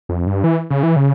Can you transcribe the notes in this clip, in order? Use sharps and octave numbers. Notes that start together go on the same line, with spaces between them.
F2
G2
E3
C#3
E3
C#3